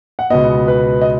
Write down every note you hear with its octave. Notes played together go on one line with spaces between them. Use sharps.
F#5
C#2 B2 B3 D#5
B4
D#5